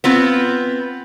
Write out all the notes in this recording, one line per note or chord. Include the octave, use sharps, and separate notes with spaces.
B3 C4 F4